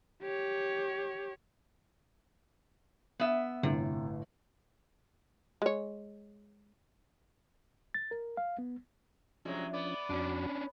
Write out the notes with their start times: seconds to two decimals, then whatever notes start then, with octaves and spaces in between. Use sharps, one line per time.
0.22 G4 C#5
3.19 B3 E5
3.63 G1 A2 C3
5.62 G#3 C#5
7.94 A6
8.11 A#4
8.37 F5
8.59 B3
9.45 C3 F3 F#3 G#3 C#4 D4
9.74 B3 D5
10.10 F2 C#4 D4 F#4